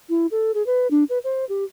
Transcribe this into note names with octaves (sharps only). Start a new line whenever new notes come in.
E4
A4
G#4
B4
D4
B4
C5
G4